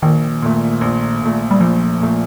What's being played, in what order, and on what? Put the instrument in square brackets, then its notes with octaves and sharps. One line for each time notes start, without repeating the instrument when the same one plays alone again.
[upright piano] A#1 [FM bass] D#3
[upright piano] A#2 A3
A#1
A#2 A3
[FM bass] G3
[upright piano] A#1 [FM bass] F3
[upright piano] A#2 A3